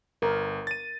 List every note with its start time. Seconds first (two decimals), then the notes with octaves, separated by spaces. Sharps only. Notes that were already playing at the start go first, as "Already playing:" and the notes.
0.22 G1 A#4
0.67 A6 D#7